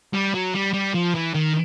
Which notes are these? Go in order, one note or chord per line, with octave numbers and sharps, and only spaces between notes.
G3
F#3
G3
G3
F3
E3
D#3